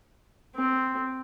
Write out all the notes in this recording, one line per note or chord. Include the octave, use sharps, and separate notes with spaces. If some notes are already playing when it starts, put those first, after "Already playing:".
C4